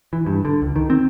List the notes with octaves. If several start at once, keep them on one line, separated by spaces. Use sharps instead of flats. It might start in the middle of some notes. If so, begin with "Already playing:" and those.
E3
G2
D3
C#2
D#3
C4